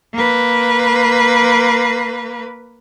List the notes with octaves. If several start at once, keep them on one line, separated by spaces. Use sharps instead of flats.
A#3 B4